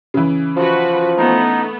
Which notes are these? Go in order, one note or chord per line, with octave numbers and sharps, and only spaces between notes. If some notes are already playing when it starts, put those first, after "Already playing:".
C#3 E3
F3 F#4 B4
A3 B3 D#4